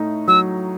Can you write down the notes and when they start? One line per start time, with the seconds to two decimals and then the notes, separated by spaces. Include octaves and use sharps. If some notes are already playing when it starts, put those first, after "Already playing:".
Already playing: A2 A3 D#4
0.28 F#3 E6